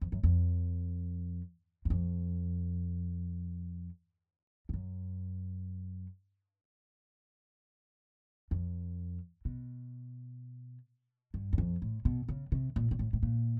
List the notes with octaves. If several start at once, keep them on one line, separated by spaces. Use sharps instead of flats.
F2
F#2
F2
F#2
F2
F2
F#2
F2
B2
G2
F#2
F2
A2
B2
C#3
C3
A#2
A#2
A2
A2
A#2